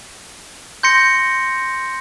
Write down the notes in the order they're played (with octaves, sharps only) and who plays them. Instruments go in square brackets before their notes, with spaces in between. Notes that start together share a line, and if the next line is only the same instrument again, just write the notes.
[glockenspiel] C6 G6 A#6 C#7